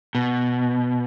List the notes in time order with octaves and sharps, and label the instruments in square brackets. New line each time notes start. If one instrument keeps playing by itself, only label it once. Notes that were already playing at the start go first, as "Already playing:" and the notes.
[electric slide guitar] B2